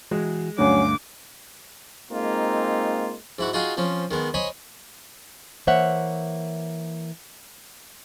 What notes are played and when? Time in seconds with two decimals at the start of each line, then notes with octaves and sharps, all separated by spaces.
0.11 E3 G#3 F#4 G#4
0.58 D2 G2 F#3 A3 C#4 F5 D6
2.11 G#3 A#3 C4 D#4 F4
3.39 G#2 E4 F#4
3.53 D#4 F4 F#4 G#4 F5 G5
3.77 F3 C4 C#4
4.11 D#3 G#3 B3
4.34 C5 C#5 D#5 G#5 B5
5.67 E3 A#3 C5 C#5 E5 F#5